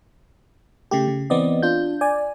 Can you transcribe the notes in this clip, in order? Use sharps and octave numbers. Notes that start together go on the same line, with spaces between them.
C#3 A3 G4
C#3
E3 B3 C4 D5 D#5
D4 F4 G6
D5 G#5